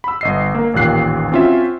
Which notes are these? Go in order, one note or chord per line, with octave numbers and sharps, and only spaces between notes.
B5 E6
G1 D#5 C7
A#3 A#4
A1 D#2 A#2 G4 F#6 C7
C4 C#4 F4 F#4 E5